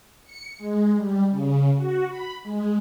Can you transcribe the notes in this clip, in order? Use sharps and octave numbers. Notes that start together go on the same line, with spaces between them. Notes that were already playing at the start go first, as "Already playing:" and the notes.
C#7
G#3
G3
C#3
F#4
B5
G#3